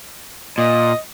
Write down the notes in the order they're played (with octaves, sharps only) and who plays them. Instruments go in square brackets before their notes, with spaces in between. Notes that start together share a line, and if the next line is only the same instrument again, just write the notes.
[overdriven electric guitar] A#2 [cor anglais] D#5